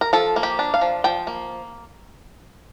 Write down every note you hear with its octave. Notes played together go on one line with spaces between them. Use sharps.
A#4
F3 A4
A#3
G4
D4
F5
F3
F3 G5
A#3